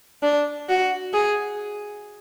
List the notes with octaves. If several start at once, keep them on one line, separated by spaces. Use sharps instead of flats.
D4
F#4
G#4